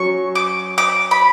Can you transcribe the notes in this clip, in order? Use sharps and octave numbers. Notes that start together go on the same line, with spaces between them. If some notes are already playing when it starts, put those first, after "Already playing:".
Already playing: F#3 C#4 C#5 C#6
D6
D6
B5